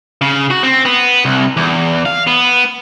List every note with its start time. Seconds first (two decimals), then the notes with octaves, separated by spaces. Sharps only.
0.21 C#3
0.50 F#4
0.63 C4
0.85 B3
1.25 C2
1.57 E2
2.06 F5
2.27 B3